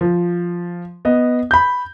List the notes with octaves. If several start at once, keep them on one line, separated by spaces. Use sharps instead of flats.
F3
B3 D#5
B5 G6